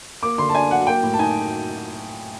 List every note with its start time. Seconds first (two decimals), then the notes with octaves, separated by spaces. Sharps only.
0.22 A#3 D6
0.38 D3 C6
0.50 A5
0.55 D4 G#5
0.70 F#3 F#5
0.87 A#3 G5
1.03 A2
1.14 A5
1.19 D#4 G#5